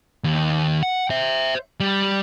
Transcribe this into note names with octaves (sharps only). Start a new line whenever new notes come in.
D#2
F#5
C5 E5
G3